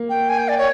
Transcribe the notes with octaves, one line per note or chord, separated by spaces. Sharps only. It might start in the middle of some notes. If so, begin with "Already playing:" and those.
Already playing: A#3
G5
G#5
G5
D5
C#5